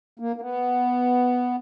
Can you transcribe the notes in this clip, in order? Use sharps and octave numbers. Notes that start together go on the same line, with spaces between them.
A#3
A#3
B3